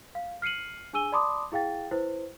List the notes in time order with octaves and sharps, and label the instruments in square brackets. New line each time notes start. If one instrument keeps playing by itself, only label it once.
[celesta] F5
F6 C7 C#7 D#7 F#7
D4 G#4 G#5 E6 D#7 G7
D5 A5 B5 C6 D6 D#6
E4 G#4 F5 G5 A6
E4 B4 C5